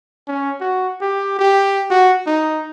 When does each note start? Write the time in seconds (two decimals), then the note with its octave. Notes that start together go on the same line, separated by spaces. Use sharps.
0.28 C#4
0.61 F#4
1.01 G4
1.39 G4
1.90 F#4
2.27 D#4